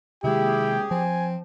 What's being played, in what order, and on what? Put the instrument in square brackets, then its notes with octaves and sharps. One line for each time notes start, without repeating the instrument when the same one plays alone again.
[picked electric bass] C3 D#3 G#3 [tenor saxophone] E4 [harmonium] G4 G#4 [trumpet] G5
[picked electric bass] F3 [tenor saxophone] C4 [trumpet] G#5